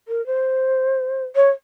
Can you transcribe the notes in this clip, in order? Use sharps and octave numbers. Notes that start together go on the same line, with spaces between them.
A#4
C5
C#5